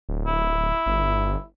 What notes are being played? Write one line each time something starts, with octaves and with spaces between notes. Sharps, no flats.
D1
E4
G1